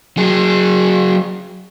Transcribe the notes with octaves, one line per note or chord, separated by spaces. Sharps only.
F#3 G#4